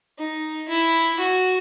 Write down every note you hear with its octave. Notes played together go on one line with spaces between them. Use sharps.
D#4
E4
F#4